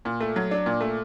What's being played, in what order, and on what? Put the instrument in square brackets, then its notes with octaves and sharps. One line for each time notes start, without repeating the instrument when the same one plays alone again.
[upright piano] A#2
A3
F#3
D4
A#2
A3